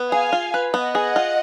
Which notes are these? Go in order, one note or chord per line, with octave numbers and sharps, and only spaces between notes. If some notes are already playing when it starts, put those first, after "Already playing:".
Already playing: B3
G#4 F5 G#5
F4
B4
B3 D#5 F#5
G#4
F4